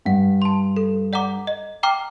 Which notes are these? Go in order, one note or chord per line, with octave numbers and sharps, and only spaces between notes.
G2 F#5
A5 C6
A4
D5 F#5 A#5 D6
D#5
G5 A#5 D6 F6